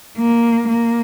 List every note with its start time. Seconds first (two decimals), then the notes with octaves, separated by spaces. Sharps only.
0.18 A#3
0.68 A#3